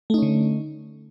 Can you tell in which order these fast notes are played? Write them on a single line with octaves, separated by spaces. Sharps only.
A3 D#4 C#4 D3